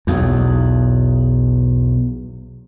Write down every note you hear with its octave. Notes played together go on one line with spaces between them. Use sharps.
B1 E2